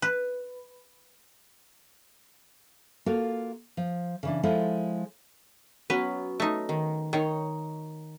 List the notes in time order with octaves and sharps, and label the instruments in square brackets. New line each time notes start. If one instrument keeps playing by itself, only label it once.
[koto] B4
[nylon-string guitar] A#3 F4 F#4 A4
F3
C#3 E3 D4
F3 G#3 E4 F4 A4
[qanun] F#3 B3 C#4 [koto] B4
[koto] A3 D#4
[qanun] D#3
[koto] D#3 [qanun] D#4 C#5